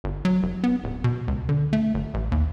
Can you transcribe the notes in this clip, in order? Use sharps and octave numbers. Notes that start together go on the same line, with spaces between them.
G1
F#3
F1
B3
D1
B2
C#2
D3
A3
G1
A1
D#2